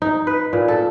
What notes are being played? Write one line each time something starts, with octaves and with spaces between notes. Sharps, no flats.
D#4
B4
A#2
A4